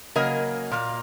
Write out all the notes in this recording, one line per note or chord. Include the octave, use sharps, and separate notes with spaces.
C#3 F#3 A#3 A#4 D#5
A#2 A#3